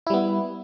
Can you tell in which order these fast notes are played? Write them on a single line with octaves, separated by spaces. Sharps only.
E4 G3 B3